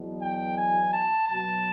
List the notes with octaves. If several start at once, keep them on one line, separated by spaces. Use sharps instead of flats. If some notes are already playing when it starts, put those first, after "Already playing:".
Already playing: E2 B2 F#3
G5
G#5
A5
B2 F#3 B3 A5